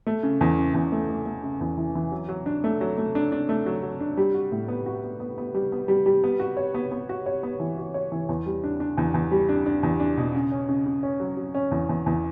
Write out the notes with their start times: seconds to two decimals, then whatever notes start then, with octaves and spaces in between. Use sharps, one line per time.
0.07 A3
0.23 C#3
0.41 E2
0.58 C#3
0.74 E2
0.92 A3
1.09 A3
1.26 A3
1.43 C#3
1.61 E2
1.77 E3
1.95 E3
2.12 F#3
2.29 F#3
2.46 D4
2.64 A3
2.81 F#3
2.98 A3
3.15 D4
3.32 D4
3.49 A3
3.66 F#3
3.83 F#3
4.01 D4
4.17 G3
4.34 F#4
4.52 A2
4.68 B3
4.86 F#4
5.03 B3
5.20 B3
5.38 B3
5.54 G3
5.72 B3
5.88 G3
6.06 G3
6.24 B3
6.40 F#4
6.57 C#5
6.74 B3
6.92 B3
7.09 F#4
7.26 C#5
7.43 B3
7.60 E3
7.78 F#4
7.94 C#5
8.12 E3
8.29 E2
8.46 G3
8.64 D4
8.80 D4
8.98 E2
9.14 E2
9.32 G3
9.49 D4
9.66 D4
9.83 E2
10.00 D4
10.17 B2
10.34 C#3
10.52 C#4
10.69 C#3
10.86 C#3
11.03 C#4
11.20 F#3
11.37 F#3
11.55 C#4
11.71 E2
11.89 E2
12.06 E2